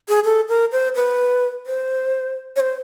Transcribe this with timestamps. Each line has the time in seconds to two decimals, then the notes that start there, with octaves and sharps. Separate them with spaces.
0.08 G#4
0.24 A4
0.49 A#4
0.72 C5
0.95 B4
1.66 C5
2.56 C#5
2.60 C5